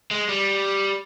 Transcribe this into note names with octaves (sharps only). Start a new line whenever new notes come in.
G#3
G3